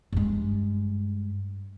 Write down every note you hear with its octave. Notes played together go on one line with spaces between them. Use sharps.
G2 G#3